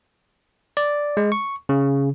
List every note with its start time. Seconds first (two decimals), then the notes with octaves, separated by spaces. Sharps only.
0.77 D5
1.17 G#3
1.32 C#6
1.69 C#3